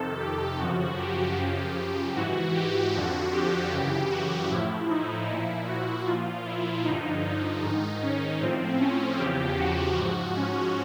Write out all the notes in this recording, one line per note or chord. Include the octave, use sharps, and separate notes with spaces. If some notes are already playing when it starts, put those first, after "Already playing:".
Already playing: F2 C3 D#3 A4
G4
F#2 C#3 F3 F#4
G4
F#2 C#3 F3
G#2 E3 F#4
G4
F2 D3 F3 F#4
G4
F#2 C#3 E3 G4
F#4
A2 F3 E4
D#4
A#2 F3 E4
F#4
A#2 F3 F4
E4
G2 D3 F3 D#4
G#2 D#3
C#4
A2 F3 C4
C#4
E2 C#3 F3 G4
F#4
G#2 F3 F#4
C#4